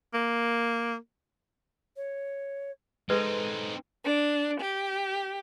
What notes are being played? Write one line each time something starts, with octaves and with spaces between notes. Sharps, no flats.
A#3
C#5
G#3 C4 D#4 A4 B4
D4
G4